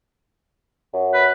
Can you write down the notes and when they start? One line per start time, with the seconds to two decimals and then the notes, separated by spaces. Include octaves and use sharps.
0.94 F#2
1.14 B4